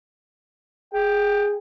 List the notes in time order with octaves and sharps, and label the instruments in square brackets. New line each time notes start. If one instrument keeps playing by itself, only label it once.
[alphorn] G#4 [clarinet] G5